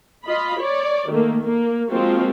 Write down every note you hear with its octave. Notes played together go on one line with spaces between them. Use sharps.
F4 D#5 B5
C#5 D5
D#3 A3 A#3
A#3
F3 G#3 A#3 C4 F4 F#4